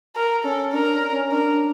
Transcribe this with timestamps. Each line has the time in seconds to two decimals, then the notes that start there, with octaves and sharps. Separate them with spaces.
0.16 A#4
0.44 C#4 A4
0.73 D4 A#4
1.12 C#4
1.31 D4 A#4